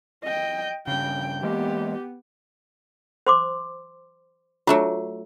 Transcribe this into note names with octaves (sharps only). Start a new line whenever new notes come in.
D#5 G5
G2 C#3 G5
E3 G#3 A#3 B3 G4
C5 C6 D6
F#3 A3 D4 F4